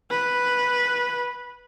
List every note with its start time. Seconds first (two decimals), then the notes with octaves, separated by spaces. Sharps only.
0.10 B4